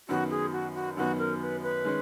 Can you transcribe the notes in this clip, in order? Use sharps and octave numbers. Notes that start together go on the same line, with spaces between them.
F#2 D#3 F#3 B3 F#4
G#4
F#4
F#4
F#2 D#3 F#3 B3 F#4
A#4
B4
B4
D#3 G#3 C#4